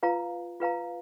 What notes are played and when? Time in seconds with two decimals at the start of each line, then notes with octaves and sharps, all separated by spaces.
0.03 F4 B4 F5 A#5
0.60 F4 B4 F5 A#5